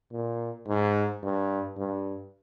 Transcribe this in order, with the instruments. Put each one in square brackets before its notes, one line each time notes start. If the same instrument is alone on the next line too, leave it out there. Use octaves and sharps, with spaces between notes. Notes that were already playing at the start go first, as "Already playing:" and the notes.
[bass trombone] A#2
G#2
G2
G2